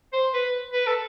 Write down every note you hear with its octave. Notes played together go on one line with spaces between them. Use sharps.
C5
B4
B4
A4